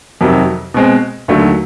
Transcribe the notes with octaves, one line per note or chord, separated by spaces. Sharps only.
F2 C3 D#3 F#3
B2 G#3 C4
D#2 D3 F#3 A3